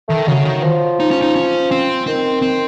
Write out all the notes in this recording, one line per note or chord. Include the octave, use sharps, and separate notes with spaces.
D#3 A3
C#3 F#3
D#3
F3
D#4
C#4
D#4
C#4
C4
D#3 C4
C4